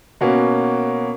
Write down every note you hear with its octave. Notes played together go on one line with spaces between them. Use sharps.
B2 A#3 C#4 F#4